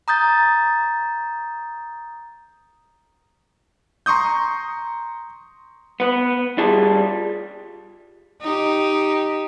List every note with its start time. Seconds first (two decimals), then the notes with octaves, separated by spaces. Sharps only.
0.08 A#5 D#6 G6 A6
4.06 A#5 C6 C#6 D#6 G6
6.00 B3 B4
6.58 G3 F4 G#4 A5
8.42 D#4 G4